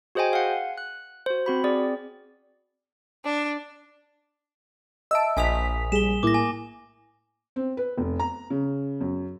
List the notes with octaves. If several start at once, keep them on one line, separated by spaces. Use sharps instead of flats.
F#4 G#4 C5 D#5 G5 G#5
F5 F#5
F#6
F#4 C5
C4 F#4 B5
C4 G#4 D5
D4
D#5 E5 A5 E6 D7
A#1 G#5 D#6 B6 F7
G3 G#4 E7 G7
A2 A#3 E4 D6 A#6
G#5
C4
B4
F1
A#5
C#3
F#2